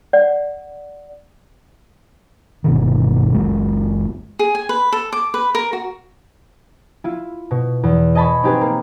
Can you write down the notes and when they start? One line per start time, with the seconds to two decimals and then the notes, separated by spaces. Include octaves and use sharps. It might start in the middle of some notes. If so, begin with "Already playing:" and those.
0.13 D5 F#5
2.64 G1 B2 D#3
3.34 F#1 G#3
4.39 G#4
4.55 G#5
4.69 B4
4.93 A4
5.13 D6
5.34 B4
5.55 A#4
5.73 F#4
7.04 E4 F4
7.51 B2
7.83 E2
8.15 D#5 G#5 A5 B5 C#6
8.43 C4 D#4 G4 G#4 B4
8.61 A#3